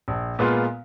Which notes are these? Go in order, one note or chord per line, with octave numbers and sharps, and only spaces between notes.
A#1
A#2 G#3 B3 F4